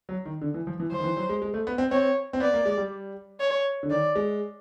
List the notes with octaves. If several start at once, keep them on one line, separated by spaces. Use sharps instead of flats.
F#3
D#3
D3
E3
F3
E3
F3 C5
D#3
E3
F#3
G#3
G#3
A3
B3
C4
C4 C#5
C4
B3 D5
A#3
G#3
G3
C#5
D3
D#3 D5
G#3